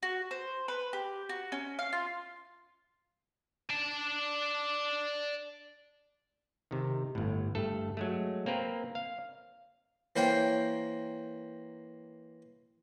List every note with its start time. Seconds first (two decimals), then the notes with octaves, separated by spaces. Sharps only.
0.03 F#4
0.31 C5
0.68 B4
0.93 G4
1.29 F#4
1.52 C#4
1.79 F5
1.93 F4
3.70 D5 A5
6.71 C3 D#3
7.15 G1 A2
7.55 G2 A3 A4
7.97 F#3 G#3 A3
8.46 A#3 C4 A#4 B4
8.95 F5
10.16 E3 A#3 A#4 C5 C#5 G5